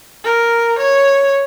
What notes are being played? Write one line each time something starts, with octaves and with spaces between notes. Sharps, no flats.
A#4
C#5